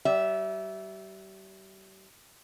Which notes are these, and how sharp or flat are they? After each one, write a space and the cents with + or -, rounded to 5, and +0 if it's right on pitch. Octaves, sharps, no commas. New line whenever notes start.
G3 -35 E5 +0